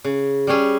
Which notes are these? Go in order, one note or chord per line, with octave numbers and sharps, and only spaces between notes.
C#3
G3 C#4 G#4